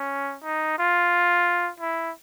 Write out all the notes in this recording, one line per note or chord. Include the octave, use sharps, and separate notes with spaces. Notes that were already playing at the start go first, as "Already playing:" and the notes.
Already playing: C#4
D#4
F4
E4